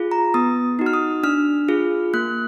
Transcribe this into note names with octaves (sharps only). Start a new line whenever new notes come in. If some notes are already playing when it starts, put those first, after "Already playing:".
Already playing: F4 G#4
A#5
B3 D#6
D#4 F#4
F6
D#6
D4 F6
F4 G#4
A#3 F#6